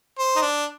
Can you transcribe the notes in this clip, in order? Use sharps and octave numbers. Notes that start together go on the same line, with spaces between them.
C5
D#4
D4